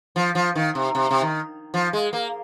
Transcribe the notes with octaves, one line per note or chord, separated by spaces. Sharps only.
F3
F3
D#3
C3
C3
C3
D#3
F3
G#3
A#3